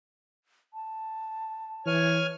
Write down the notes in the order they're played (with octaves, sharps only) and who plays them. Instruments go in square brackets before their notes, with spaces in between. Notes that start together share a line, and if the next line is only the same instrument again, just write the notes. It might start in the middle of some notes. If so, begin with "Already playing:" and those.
[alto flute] A5
[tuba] E3 [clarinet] C#5 [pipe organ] G#5 F6